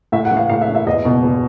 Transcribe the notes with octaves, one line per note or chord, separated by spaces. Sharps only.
A2 E5
F#5
E3
F5
A2 F5
E5
E3
E5
E2 D#5
B2
E2